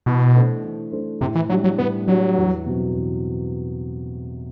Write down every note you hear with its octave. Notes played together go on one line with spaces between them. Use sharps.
B2 E3
A3 D4 A4 C5
E3
A3 D4 A4 C5
A2 C3
E3
F#3 G3 D4 G4
F#3
A2 B3
F#3 G3 D4 G4
E2
B2 F#3 C4
E2